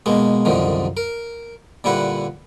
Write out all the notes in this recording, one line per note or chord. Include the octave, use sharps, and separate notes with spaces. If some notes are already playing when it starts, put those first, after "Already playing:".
B2 G#3 A#3
C2 F#2 D3 D#3 F3
A#4
A#2 D3 G3 E4 B4 F#5